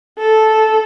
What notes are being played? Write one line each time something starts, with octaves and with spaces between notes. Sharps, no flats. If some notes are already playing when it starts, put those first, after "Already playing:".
A4